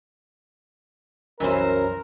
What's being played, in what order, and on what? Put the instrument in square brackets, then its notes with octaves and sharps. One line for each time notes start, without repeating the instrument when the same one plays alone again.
[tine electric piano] C2 F#2 F#3 [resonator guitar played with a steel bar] E3 C5 [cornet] A#4